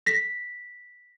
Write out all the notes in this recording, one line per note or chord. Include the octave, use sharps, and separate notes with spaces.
A#6 B6